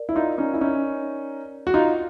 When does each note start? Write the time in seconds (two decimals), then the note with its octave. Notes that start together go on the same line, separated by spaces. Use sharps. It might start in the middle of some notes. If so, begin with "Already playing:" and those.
Already playing: A#4 D5
0.09 E4
0.15 D#4 F4
0.38 C#4 D#4
0.54 E4
0.61 C#4 D#4
1.67 F#4
1.74 D#4 F4